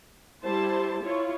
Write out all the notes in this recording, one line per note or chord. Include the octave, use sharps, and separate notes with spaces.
G3 E4 C5 A5
E4 F4 C#5